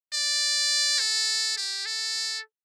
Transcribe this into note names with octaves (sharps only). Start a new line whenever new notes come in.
D5
A4
G4
A4